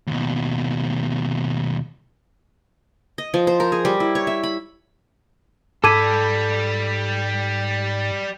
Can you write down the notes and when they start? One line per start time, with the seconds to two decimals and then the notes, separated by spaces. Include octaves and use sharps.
0.07 D#2 B2
3.18 D#5
3.34 F3
3.47 C5
3.60 A#4
3.72 G#4
3.85 G3
4.00 E4
4.15 C#5
4.27 E5
4.43 B5
5.84 G#2 G3 A4 B5 D6 G#6 D#7